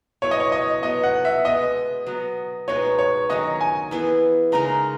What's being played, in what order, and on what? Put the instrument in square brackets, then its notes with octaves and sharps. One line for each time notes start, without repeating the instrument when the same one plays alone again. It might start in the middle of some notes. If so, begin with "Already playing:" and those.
[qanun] B2 F#3 C#4 E4 [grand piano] C#5
[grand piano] D#5
C#5
D#5
[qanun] B2 F#3 B3 [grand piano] D#5
[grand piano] F#5
E5
[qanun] B2 G#3 B3 [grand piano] D#5
[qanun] F#3 B3 F#4
[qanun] B2 G#3 B3 D#4 [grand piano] C#5
[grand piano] C#5
[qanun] D#3 F#3 C#4 F#4 [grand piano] D#5
[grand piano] G#5
[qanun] E3 B3 E4 G#4
[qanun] C#3 G#3 D#4 A#4 [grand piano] A#5